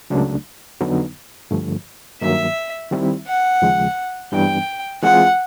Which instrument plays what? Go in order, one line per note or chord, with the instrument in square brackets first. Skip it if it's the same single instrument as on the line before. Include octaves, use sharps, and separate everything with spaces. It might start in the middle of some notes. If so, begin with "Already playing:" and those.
[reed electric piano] C#2 C#3 F#3 A3 D4
F2 D3 F#3 B3 D#4
G2 D3 F3 A3
[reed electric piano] G2 D#3 F#3 A#3 [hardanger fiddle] E5
[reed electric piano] D#3 G3 C4 E4
[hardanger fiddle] F#5
[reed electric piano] D#2 C#3 F3 G#3
[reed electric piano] G2 E3 G3 B3 D4 [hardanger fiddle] G5
[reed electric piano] E3 G#3 C4 F4 G#4 [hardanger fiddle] F#5